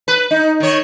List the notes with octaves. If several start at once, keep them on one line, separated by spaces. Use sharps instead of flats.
B4
D#4
D#3 C#5